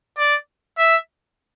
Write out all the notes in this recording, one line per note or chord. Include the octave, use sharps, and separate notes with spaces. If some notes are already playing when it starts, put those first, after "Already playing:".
D5
E5